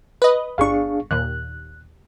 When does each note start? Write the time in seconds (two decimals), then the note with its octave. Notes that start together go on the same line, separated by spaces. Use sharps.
0.22 B4 D#5
0.58 G1 D4 G#4 F5 C#6
1.11 D#2 A#2 F#6